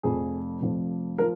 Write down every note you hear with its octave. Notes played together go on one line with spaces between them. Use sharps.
F1 F2 F3 G#4
F1 F2 F3
F3 A#4